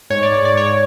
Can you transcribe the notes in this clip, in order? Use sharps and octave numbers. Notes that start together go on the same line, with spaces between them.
G#2 C#5
D5
G#2 C#5
D5
G#2 C#5